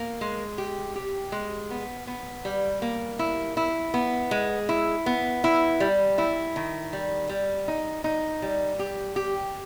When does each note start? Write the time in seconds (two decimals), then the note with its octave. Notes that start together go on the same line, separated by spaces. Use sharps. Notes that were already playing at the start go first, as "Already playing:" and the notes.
Already playing: A#3
0.21 G#3
0.58 G4
0.95 G4
1.32 G#3
1.71 B3
2.07 B3
2.45 G3
2.82 A#3
3.19 E4
3.57 E4
3.94 B3
4.31 G#3
4.69 E4
5.06 B3
5.44 E4
5.80 G3
6.18 E4
6.56 D#3
6.93 G3
7.29 G3
7.68 D#4
8.04 D#4
8.42 G3
8.79 G4
9.16 G4